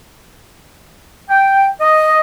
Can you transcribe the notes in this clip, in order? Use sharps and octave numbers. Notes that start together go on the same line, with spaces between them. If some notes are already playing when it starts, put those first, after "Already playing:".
G5
D#5